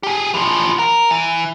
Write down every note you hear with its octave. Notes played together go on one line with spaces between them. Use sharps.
G4 G#4
E3 F3
A#4
E3